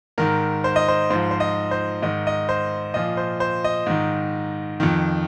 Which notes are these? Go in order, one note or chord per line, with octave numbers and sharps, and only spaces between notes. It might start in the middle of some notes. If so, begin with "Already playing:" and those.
G#2 D#3 A#4
C5
D#5
C5
G#2 F3 C5
C5
D#5
C5
G#2 D#3 D#5
D#5
C5
A#2 F3 D#5
C5
C5
D#5
G#2 D#3
F2 D#3